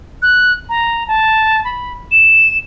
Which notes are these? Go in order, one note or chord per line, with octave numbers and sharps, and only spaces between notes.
F#6
A#5
A5
B5
E7